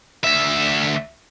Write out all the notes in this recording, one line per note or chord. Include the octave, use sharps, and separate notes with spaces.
D2 E5